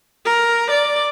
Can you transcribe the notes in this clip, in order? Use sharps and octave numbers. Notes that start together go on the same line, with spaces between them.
A#4
D5